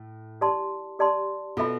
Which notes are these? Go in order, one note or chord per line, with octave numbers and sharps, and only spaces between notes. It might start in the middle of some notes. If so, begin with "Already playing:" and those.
Already playing: A2
G4 D5 A5 C6
G4 D5 A5 C6
B2 B3 F4 A4 E5 B5